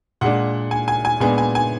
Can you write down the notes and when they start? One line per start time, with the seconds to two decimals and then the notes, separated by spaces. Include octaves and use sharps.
0.21 A#2 G#3 D4 F#5
0.71 G#5
0.88 G#5
1.05 G#5
1.20 A#2 G#3 B3 D4 G#5
1.38 G#5
1.55 G#5